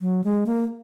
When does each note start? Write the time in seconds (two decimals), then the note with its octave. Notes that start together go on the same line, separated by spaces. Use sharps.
0.01 F#3
0.24 G#3
0.46 A#3